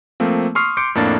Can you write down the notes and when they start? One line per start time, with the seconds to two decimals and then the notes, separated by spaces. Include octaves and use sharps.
0.20 F3 A3 A#3 C4
0.55 C6 C#6 D#6 F6 C7
0.77 C6 D6 G6 C#7 D7
0.95 F2 A2 A#3 D4 A6